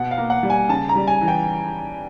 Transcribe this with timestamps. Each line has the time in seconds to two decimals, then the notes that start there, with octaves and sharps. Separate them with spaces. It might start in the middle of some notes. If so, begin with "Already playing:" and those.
Already playing: B2 F#5
0.11 F5
0.18 A#3
0.30 F#5
0.43 G3
0.50 G#5
0.69 C#3 A5
0.89 A#5
0.95 G3
1.07 G#5
1.21 E3
1.28 G5